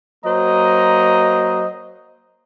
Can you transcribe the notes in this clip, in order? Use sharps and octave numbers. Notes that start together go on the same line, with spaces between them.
F#3 A#3 C5 D#5 A#5